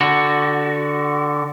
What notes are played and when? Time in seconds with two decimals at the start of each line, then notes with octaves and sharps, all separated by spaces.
0.01 D3 F#4